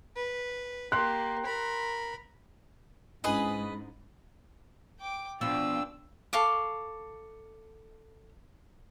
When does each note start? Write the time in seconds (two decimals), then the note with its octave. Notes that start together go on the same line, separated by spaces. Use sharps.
0.16 B4
0.92 A#3 G4 C6 F#6
1.44 A#4 B5
3.24 G#2 C#4 D4 E4 G#4 B4 D#5
5.00 G5 D6
5.41 B2 F3 B3 D4 F4 G5 E6
6.33 A4 F5 C#6 D6